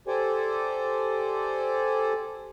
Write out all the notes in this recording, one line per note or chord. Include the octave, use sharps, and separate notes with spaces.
G4 A4 C5 D5 G#5